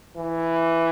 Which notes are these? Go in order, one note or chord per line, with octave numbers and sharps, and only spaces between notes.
E3